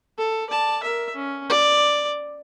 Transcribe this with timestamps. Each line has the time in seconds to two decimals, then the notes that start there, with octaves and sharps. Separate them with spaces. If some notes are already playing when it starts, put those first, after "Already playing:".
0.18 A4
0.50 D5 A5
0.83 A#4 E5
1.16 C#4
1.50 D5